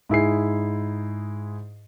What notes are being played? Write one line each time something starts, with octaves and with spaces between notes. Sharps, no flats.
G#2 E4 G#4 C7